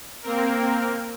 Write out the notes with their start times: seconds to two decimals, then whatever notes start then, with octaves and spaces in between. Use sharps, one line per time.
0.22 A#3 C4 A#4